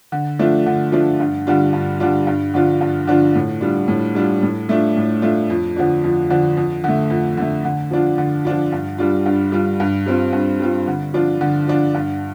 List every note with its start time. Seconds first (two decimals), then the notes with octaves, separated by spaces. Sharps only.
0.12 D3
0.39 F3 A3 D4 F4
0.66 D3
0.92 F3 A3 D4 F4
1.20 G2
1.47 D3 G3 D4 F4
1.73 G2
2.00 D3 G3 D4 F4
2.27 G2
2.54 D3 F3 D4 F4
2.81 G2
3.07 D3 F3 D4 F4
3.35 A2
3.61 G3 D4 F4
3.88 A2
4.15 G3 D4 F4
4.43 A2
4.69 A3 D4 F4
4.96 A2
5.22 A3 D4 F4
5.50 F2
5.76 D3 F3 D4
6.04 F2
6.30 D3 F3 D4
6.57 F2
6.84 D3 A3
7.10 F2
7.37 D3 A3
7.65 D3
7.91 F3 D4 F4
8.18 D3
8.45 F3 D4 F4
8.72 G2
8.98 G3 D4 F4
9.26 G2
9.52 G3 D4 F4
9.80 G2
10.06 G3 C4 F4
10.33 G2
10.60 G3 C4 F4
10.88 D3
11.14 F3 D4 F4
11.41 D3
11.68 F3 D4 F4
11.94 G2